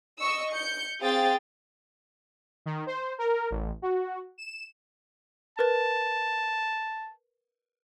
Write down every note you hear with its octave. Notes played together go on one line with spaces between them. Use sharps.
D#5 C#6 E6
G6 C#7
C4 G#4 F5 G5 A6
D#3
C5
A#4
A1
F#4
E7
A#4 B4 A5 A6